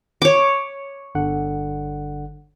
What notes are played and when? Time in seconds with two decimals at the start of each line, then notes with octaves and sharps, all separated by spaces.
0.22 C#5 D6
1.15 G1 D3 F#5